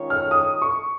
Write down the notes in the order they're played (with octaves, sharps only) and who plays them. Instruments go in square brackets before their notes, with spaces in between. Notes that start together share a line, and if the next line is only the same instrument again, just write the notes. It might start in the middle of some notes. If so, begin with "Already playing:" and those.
Already playing: [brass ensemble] D#3 G#3 C#4 F4 C#5
[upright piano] F6
D#6
C#6